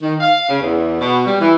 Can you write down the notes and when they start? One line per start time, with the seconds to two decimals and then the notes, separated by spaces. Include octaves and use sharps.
0.02 D#3
0.20 F5
0.49 C#3
0.60 E2
1.00 B2
1.26 G3
1.40 E3